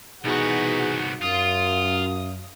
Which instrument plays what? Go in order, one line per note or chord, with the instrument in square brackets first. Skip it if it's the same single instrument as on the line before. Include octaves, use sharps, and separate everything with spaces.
[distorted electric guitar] C2 B3 [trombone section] B2 E3 G#4 [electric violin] D#4 F#4 [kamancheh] F#5
[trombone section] F#2 [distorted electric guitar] F4 [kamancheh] F5 [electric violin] D#6